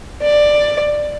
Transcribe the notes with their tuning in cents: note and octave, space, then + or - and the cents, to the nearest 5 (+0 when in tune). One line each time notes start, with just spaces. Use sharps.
D5 +10